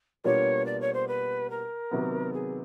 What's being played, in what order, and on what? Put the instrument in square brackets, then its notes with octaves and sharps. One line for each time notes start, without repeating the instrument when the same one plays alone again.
[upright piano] B2 G3 A#3 D4 F4 [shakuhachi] C#5
[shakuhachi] D5
C#5
C5
B4
A#4
[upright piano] C3 D#3 F#3 B3
[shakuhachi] G#4